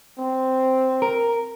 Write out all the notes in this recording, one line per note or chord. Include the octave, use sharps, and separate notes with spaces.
C4
A#4